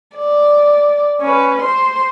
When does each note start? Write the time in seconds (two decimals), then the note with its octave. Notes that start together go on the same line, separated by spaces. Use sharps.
0.17 D5
1.21 C#4 B4
1.62 C5 C6